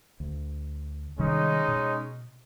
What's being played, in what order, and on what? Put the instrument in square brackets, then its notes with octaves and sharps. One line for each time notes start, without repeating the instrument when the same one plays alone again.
[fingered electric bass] D2
[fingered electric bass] C3 D#3 G3 [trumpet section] G#3 C#4 D#4
[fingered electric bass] B2